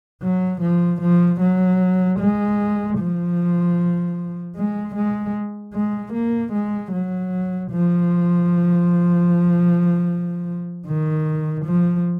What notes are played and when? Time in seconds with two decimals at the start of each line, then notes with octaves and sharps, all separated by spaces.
0.23 F#3
0.61 F3
1.01 F3
1.41 F#3
2.20 G#3
2.98 F3
4.56 G#3
4.95 G#3
5.74 G#3
6.13 A#3
6.53 G#3
6.92 F#3
7.71 F3
10.86 D#3
11.65 F3